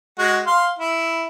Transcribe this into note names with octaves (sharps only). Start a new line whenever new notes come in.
G#3 F#4
F5 C6
E4